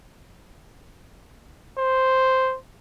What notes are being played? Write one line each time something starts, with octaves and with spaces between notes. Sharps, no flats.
C5